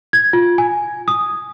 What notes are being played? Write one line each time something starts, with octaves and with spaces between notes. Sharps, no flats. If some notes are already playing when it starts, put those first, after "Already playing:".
G#6
F4
G#5
D#6